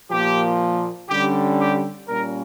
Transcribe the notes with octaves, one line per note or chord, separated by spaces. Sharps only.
A#2 F3 A#3 G4
D3 G3 C#4 G4
G4
A#2 G3 A#3 C#4 A#4